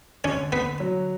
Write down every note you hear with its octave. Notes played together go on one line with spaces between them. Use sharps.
D3 C#4 C#5
D3 B3 B4
F#3